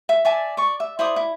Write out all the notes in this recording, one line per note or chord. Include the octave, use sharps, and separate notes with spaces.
E5
D5 E5 G#5 A5
D5 C#6
E5
E4 C5 D5 D#6
E4